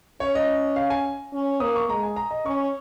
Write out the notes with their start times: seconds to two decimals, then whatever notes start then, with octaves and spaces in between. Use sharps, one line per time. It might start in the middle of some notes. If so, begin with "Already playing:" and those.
0.20 C#4 C#5
0.35 D#5
0.76 F5
0.90 G#5
1.33 C#4
1.60 A#3 D#6
1.76 C#6
1.89 G#3 A#5
2.03 G#5
2.16 A#5
2.31 D#5
2.46 C#4 C#6